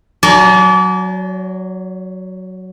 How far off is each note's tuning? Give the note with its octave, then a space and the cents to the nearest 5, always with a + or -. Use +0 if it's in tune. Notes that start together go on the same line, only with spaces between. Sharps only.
F#3 +5 D5 -35 G#5 +45